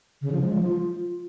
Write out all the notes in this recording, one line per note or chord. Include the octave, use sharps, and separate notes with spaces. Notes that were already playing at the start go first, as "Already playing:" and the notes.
C#3
F3
G#3
F3
F4